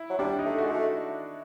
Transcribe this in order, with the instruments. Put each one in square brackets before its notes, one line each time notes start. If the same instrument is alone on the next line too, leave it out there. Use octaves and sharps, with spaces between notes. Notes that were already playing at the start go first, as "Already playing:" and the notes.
Already playing: [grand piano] E4
[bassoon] F#3
[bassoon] G3 [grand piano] D4
[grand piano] D#4
[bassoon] A3
[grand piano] F#4
[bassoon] G#3
A3